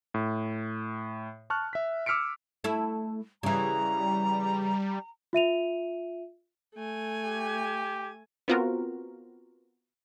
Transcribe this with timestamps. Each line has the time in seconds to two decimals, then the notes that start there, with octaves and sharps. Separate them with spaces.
0.14 A2
1.50 A5 C#6 F6 F#6
1.73 E5 B6
2.06 D6 E6 F6 B6 C#7 D7
2.64 A3 E4
3.43 C#3 E3 G3 A#5
5.33 F4 E5 D#7 F7
6.75 A3 G#5
7.24 G4
8.48 B3 C4 F4 F#4 A#4